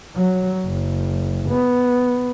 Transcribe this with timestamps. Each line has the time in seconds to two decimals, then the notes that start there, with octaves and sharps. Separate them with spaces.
0.16 F#3
0.66 F#1
1.49 B3